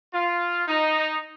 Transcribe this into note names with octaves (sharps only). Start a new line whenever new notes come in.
F4
D#4